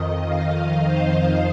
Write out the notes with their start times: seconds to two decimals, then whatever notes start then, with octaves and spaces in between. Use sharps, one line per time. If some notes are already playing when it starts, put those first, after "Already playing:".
Already playing: F2 D#3 D#5
0.23 F5
0.82 C5